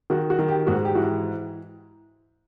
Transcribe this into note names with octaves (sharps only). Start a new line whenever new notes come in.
D#3 F#4
F#4
D#3
G4
G#2 F#4
G4
E3 F#4